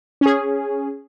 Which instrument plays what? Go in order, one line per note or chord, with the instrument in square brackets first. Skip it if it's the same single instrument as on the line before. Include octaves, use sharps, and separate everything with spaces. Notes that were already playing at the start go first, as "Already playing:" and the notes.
[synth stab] C#4 G#4